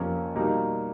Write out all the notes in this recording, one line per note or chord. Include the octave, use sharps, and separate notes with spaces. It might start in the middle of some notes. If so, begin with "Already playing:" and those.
Already playing: F2 C3 F3 A#3 C#4
B2 G3 A#3 D#4